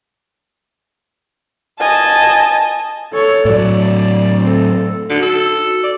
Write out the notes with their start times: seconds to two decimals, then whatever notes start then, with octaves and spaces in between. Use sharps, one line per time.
1.81 D#5 G#5 A5
3.13 A4 C#5
3.45 A2 F#3 D5
4.41 C4 A4
5.10 D3 D#4 F#4
5.22 A4
5.84 D5